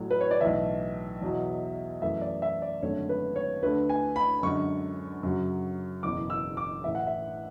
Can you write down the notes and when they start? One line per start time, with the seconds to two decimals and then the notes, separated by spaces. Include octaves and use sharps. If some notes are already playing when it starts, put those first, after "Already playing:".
Already playing: A1 A2 F#3 A3
0.11 B4
0.21 C#5
0.31 D5
0.41 B1 A2 E3 E5
1.22 E2 B2 F#3
2.02 F#2 E3 A3 E5
2.21 D5
2.42 E5
2.62 D5
2.82 G#1 F#2 D3 A3 C#5
3.09 B4
3.36 C#5
3.62 D2 D3 A3 B4
3.90 G#5
4.16 B5
4.43 F#2 D3 G#3 C#6
5.23 F#2 C#3 F#3
6.03 F#1 E2 B2 D6
6.30 E6
6.57 D6
6.84 A1 A2 E3 E5
6.95 F#5
7.07 E5